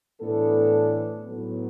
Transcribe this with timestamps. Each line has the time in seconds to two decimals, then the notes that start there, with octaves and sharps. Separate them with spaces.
0.21 A2 E3 B3 D4 A4
1.26 A2 F#3 B3